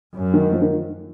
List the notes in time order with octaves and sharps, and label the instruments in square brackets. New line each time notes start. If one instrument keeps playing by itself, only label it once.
[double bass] F#2
[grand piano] D#3
F3
D#3